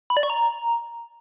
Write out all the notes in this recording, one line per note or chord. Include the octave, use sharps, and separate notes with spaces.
B5
D5
C#6
A#5